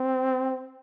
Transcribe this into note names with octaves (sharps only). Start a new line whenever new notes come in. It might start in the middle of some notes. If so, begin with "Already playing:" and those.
Already playing: C4